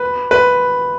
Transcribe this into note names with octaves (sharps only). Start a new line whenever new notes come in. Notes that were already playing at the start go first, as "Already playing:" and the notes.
Already playing: B4
B4